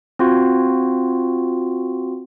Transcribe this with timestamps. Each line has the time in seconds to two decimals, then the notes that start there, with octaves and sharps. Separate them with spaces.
0.19 C4 F4 F#4